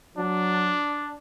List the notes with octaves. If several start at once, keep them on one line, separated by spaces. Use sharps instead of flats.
F#3 D4